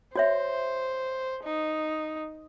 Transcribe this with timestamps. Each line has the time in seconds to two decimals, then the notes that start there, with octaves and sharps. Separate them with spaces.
0.16 F#4 C5 C#5 E5
1.44 D#4